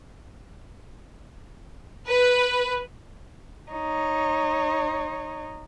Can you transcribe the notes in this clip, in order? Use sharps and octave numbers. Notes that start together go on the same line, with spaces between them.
B4
D#4 C#5